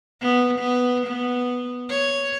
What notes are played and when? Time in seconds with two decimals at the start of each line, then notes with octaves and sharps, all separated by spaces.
0.21 B3
0.59 B3
1.06 B3
1.89 C#5